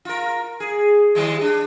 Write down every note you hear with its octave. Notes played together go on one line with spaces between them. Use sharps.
F4 A#4
G#4
D#3 G3 G#3
D4